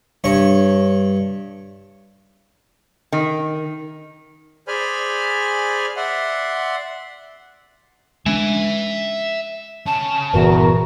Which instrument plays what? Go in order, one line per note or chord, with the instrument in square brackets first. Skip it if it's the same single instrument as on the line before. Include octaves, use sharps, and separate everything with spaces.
[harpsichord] G2 C#5 C#6
[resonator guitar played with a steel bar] D#3
[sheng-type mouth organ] G#4 C5 D5 G#5 B5 F6
D5 E5 F#5 C6
[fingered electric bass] G#3 C#4 D4 [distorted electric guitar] E5 G#5
[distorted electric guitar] C#3 [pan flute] A5
[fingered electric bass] G1 A#2 E3 [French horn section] E2 A#4 [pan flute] F#4